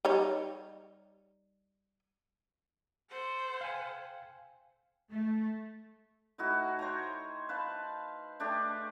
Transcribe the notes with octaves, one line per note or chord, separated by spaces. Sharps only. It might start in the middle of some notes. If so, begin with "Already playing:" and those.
G3 D#4 C#5
A4 C5 F#5
F5 G5 G#5
A3
A2 D#4 E4 F#4
C5 C#5 G5 A#5
B4 C5 F5 A5
A3 D4 G4 G#4